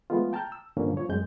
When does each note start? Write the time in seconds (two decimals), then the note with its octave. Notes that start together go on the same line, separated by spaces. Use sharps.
0.10 F3 G#3 A3 B3 F4
0.33 G5 A5 A#5 F6 G6
0.52 E6
0.77 G2 A#2 D3 F3 A#3 C#4
0.97 F3 C#5
1.09 F#2 G#3 G6